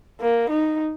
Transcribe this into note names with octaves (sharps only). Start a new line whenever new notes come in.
A#3
D#4